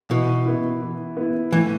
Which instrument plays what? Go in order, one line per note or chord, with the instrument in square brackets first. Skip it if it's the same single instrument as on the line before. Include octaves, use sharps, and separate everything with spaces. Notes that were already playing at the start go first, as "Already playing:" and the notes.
[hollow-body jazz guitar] B2 [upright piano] E3
[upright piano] B3 E4
E3
B3 E4
[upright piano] A2 [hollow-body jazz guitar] E3